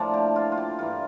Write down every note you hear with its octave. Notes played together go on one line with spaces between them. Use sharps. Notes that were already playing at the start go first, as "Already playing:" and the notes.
Already playing: A2 F3 A#3 D4 D5
G4
F4
F4
G4
G2 E3 A#3 F4